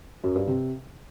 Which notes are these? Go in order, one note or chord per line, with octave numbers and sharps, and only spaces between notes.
F#2
G2
C3